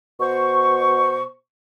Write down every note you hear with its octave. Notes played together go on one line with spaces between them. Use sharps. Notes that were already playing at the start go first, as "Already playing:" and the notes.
B2 C5 C#6